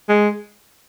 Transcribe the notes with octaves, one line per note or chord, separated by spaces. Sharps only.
G#3